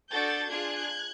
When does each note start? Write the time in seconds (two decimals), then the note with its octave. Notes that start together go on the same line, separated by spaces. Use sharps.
0.11 D4 F#4 A4 G6 A6
0.51 D4 F4 G#4 F#6 G#6